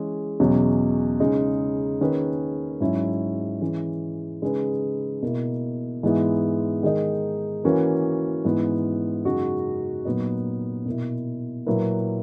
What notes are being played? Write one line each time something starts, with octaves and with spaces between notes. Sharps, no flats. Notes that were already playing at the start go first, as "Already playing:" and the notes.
Already playing: E3 G#3 C#4 G#4
E2 B2 F#3 C#4
C#3 G#3 D#4
D#3 A#3 C#4 G#4 B4
G#2 F#3 C#4 E4
E3 G#3 C#4
C#3 G#3 D#4 G#4 B4
B2 A#3 E4
G#2 E3 G#3 B3 E4
D#3 G#3 D#4
E3 A#3 C#4 F#4 B4
G#2 E3 B3 E4 B4
F#2 C#3 G#3 D#4 F#4
A#2 F#3 B3 D#4
B2 A#3 E4
A#2 F#3 A#3 E4 B4